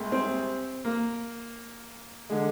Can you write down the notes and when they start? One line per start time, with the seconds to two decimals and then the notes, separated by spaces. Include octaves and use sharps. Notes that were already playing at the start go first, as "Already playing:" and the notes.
Already playing: C2 A#2 G#3
0.12 C4
0.85 A#3
2.30 D3 G#3